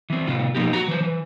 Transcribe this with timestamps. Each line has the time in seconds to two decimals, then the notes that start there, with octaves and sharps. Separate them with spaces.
0.10 E3 C4
0.27 A2 C3 F4
0.55 B2 F3 A#3 D#4 G4
0.73 F#4 A#5
0.88 E3 C5
1.01 E3